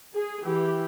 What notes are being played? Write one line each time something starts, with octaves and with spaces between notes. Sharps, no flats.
G#4
E3 G4